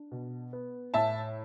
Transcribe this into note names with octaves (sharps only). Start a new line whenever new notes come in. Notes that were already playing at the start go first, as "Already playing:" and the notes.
Already playing: D4
B2
B3
A2 E5 A5